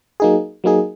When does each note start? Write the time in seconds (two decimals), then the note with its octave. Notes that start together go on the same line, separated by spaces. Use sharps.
0.20 F#3 A#3 D#4 G#4
0.64 F#3 A#3 D#4 G#4